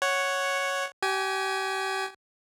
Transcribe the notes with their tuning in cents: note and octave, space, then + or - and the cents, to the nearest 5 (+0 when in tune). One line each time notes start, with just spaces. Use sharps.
C#5 +0 F#5 +0
G4 -35 G#5 +0